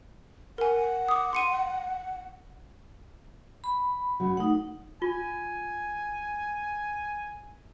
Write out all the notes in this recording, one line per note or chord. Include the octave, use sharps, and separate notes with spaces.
A#4 F#5 G#5
D6 D#6
C6 C#7 D#7
B5
C#3 F#3
A3 D#4 F#5
F4 G#5